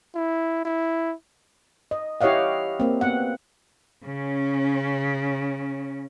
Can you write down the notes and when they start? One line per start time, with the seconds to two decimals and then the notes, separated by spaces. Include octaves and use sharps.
0.15 E4
0.65 E4
1.91 D#5
2.21 E4 G4 C#5 D#5 F5 F#5
2.80 A#3 C4
3.01 B3 F#5
4.04 C#3 C#4